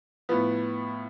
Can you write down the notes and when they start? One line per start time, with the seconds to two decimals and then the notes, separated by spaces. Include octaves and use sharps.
0.29 A2 F3 B3